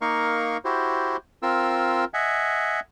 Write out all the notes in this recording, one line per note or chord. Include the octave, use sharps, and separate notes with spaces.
A#3 D#4 A#4 F5 C#6
E4 F#4 G4 C5
C4 F4 A#4 E6
D#5 E5 F#5 G#5